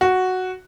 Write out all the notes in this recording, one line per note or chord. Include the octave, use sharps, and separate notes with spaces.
F#4